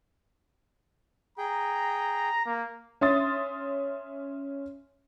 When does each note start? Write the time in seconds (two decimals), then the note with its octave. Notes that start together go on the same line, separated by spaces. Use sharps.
1.38 G#4 G5 A#5
2.46 A#3
3.01 C#4 E5 C6 D#6 A6